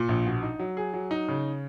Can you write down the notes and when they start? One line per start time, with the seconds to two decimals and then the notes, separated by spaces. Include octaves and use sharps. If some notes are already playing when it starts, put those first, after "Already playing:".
Already playing: A#2
0.09 A#1
0.27 B2
0.43 D#4
0.59 F#3
0.77 G#4
0.94 F#3
1.11 D#4
1.28 C#3